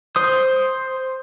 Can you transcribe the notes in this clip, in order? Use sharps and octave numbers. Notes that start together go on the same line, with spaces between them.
C5 D#6